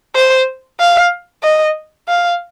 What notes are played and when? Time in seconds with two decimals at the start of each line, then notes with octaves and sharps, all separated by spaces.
0.15 C5
0.80 F5
1.43 D#5
2.08 F5